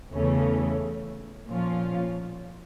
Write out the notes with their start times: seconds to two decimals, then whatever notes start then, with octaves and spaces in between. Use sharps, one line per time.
0.13 E2 C#3 E3 A3 C#4
1.47 A#2 F3 C#4 F4